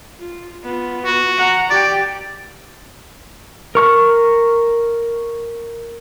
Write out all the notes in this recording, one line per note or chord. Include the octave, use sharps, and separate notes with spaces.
F4
B3 F4
F#4
F#5 A#5
G4 D5 G5
A#4 C#6 F6